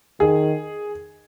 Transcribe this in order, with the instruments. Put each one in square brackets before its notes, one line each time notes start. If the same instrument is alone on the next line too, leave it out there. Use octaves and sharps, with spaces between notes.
[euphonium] D#3 [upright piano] G#4